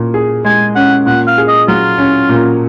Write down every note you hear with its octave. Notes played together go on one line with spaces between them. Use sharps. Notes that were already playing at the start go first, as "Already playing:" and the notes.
Already playing: A#2 C#4
G#4
G#3 G#5
C#4 F#5
A#2 F#5
F5
G#4
D#5
F#3 F4
C#4
A#2